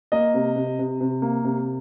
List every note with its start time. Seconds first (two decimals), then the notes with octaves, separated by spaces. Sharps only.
0.12 A#3 D#5
0.34 C3
0.56 C3
0.79 C3
1.01 C3
1.22 A#3
1.44 C3